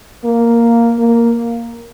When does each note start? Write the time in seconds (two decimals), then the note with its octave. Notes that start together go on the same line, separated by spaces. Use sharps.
0.25 A#3
0.99 A#3